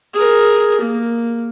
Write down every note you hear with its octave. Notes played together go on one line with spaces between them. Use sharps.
G#4 A#4
A#3